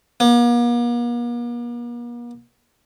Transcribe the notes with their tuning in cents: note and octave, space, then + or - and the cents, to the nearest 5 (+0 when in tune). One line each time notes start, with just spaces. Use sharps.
A#3 +45